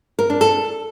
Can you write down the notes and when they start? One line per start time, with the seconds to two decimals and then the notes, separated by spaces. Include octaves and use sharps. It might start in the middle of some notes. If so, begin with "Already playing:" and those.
0.19 A#4
0.30 D4
0.41 A4